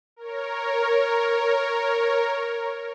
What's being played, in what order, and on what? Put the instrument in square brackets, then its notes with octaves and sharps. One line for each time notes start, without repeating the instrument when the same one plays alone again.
[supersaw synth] A#4 C#5